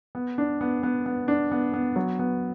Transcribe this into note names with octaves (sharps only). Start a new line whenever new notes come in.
B3
D4
B3
B3
B3
D4
B3
B3
F#3
B3